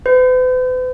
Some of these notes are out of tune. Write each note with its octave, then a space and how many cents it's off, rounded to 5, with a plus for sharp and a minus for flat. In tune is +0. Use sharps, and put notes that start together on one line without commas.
B4 +45